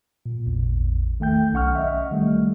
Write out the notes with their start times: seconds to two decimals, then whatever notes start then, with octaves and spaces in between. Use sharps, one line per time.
0.26 A#2
0.46 A1 E2
1.20 D#3 A3 G5 G6
1.53 B1 C#4 F#5 C#6 F6
1.75 D#5 E5
2.11 D#3 G3 A3